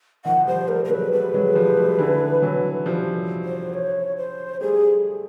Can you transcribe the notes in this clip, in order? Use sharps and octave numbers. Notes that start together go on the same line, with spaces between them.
D#3 F3 F#5
F3 G3 C5
G3 A3 A#4
A#4
F#3 G#3 B4
G3 A3 B4
F#3 G#3
F3 G3
G3 A3
D3 E3
E3 F#3
F3 G3 C5
C5
C#5
C5
G3 A3 G#4